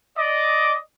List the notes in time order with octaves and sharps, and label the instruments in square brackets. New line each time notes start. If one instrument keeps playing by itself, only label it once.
[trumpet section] D5 D#5 D6